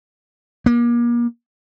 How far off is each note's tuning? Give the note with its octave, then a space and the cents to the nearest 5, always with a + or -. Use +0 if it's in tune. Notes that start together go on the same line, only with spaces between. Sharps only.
A#3 +35